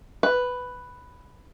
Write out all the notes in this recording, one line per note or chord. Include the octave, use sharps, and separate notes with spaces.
B4